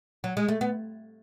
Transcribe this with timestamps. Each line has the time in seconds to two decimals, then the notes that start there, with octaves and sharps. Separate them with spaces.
0.24 F#3
0.37 G#3
0.48 A3
0.61 B3